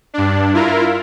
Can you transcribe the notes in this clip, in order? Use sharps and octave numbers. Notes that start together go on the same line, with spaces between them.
G2 D4
E4 F4 A#4